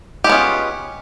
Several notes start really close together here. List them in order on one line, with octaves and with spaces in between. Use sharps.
G4 G#3 B3 C#4 F4